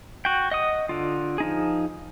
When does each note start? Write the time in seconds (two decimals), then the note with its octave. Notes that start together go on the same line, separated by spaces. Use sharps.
0.25 F#4 G5
0.51 D#5 F#5 D#6
0.89 D3 F4
1.38 F3 D#4 G#4